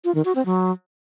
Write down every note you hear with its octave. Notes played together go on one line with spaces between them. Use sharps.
F4
D#3
F#4
C4
F#3